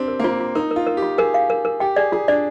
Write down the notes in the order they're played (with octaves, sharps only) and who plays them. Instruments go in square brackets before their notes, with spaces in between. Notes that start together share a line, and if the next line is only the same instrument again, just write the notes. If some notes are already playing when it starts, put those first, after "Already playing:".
Already playing: [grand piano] C4 D4 G4
[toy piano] A#4
[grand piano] A#3
[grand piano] C4 [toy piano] F4
[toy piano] F4
[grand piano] D#4 [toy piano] A#4
[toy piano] A#4
[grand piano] F4
[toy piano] A#4
[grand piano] G4
[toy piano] F4
[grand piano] G#4 [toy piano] A#4
[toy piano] F5
A#4
A#4
[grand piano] G4 [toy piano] G5
[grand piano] G#4 [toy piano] D5
[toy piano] F4 [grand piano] G#4
[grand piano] D4 [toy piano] D5